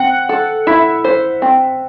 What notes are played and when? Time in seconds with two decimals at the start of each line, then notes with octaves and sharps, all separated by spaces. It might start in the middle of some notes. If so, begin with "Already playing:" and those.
Already playing: C4 F#5
0.29 A4
0.67 E4 E5
1.04 C5
1.42 C4